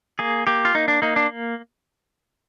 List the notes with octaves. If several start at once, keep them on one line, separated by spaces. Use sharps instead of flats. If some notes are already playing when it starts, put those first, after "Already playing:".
A#3 G#4
A#3 G4
F4
A#3 D#4
D4
A#3 D#4
D4